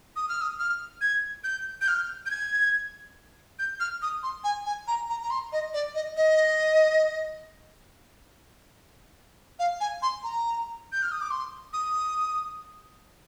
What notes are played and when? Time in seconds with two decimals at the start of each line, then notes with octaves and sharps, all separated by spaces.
0.16 D#6
0.29 F6
0.41 D#6
0.59 F6
1.01 G#6
1.44 G6
1.81 G6
1.88 F6
2.26 G6
2.31 G#6
3.59 G6
3.80 F6
4.02 D#6
4.23 C6
4.44 G#5
4.66 G#5
4.87 A#5
5.09 A#5
5.22 A#5
5.30 C6
5.52 D#5
5.74 D5
5.95 D#5
6.17 D#5
9.59 F5
9.80 G#5
10.02 C6
10.24 A#5
10.92 G6
11.02 F6
11.12 D#6
11.21 D6
11.31 C6
11.73 D#6